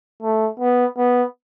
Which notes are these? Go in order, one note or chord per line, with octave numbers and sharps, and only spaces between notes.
A3
B3
B3